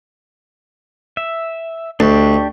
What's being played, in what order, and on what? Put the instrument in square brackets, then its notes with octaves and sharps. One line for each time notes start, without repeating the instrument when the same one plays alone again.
[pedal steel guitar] E5
[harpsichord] D2 [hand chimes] A3 C#6 [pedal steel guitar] D4 G4